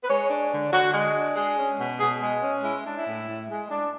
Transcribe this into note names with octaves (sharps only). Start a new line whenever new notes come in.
B4
G#3 C#5
D4
D3
D3 F#4
G#3
D4
G#3 G#4
C#4
B2
B2 G#4
G#3
C#4
G#3 E4
D4
E4
A2
A2
G#3
D4